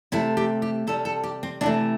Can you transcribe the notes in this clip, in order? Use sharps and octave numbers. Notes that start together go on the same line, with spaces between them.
C3 A3 E4
G4
G4
C3 G3 A4
A4
G4
C4
C3 E3 A3 D4